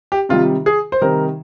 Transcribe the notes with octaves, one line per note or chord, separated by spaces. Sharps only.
G4
C3 D#3 G3 F4
G#4
C5
C3 D#3 G3 A#4